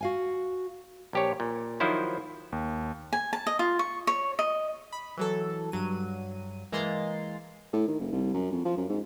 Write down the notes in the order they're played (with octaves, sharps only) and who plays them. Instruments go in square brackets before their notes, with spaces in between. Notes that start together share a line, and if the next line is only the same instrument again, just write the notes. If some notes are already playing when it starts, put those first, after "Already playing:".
[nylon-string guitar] F#4 F5 G#5
[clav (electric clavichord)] A#1 G4 C#5
A#2
D#3 F3 F#3 E4 C5
[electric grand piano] D#2
[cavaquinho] G#5
A5
D#5
F4
C#6
C#5
D#5
[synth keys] B5
E3 F#3 A4
G2 F#3 D#7
E3 G#3 A#3 A#5 C6 A6
[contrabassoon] A2
D#3
F#1
C2
F#2
F2
F3
F#2
G#2